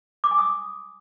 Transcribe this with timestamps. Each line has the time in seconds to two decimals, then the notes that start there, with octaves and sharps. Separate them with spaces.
0.24 D6
0.31 G#5
0.38 D#6